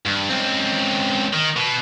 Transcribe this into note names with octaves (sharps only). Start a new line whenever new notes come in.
G2
C#2 C4
D#3
B2